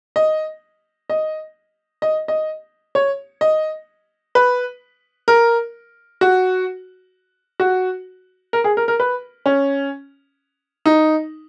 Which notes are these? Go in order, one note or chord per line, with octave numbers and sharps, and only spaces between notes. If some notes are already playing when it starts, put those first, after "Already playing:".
D#5
D#5
D#5
D#5
C#5
D#5
B4
A#4
F#4
F#4
A#4
G#4
A#4
A#4
B4
C#4
D#4